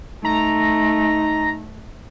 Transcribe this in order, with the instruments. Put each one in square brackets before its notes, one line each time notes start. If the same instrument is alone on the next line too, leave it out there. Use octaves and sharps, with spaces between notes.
[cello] A3 [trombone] D#4 [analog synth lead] A#5